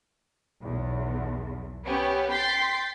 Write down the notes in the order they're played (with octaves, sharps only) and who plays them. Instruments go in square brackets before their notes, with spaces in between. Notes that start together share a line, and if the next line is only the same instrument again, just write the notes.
[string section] B1 E2
B3 C#4 G4 B4
G5 C6 G6 A6 B6 C7